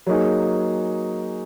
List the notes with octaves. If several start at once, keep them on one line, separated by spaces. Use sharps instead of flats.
F#3 A#3 D#4 G#4